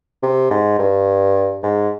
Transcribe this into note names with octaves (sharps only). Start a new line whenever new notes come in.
C3
G#2
G2
G#2